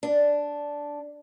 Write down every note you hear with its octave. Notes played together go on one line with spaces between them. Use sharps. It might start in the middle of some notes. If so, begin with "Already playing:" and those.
D4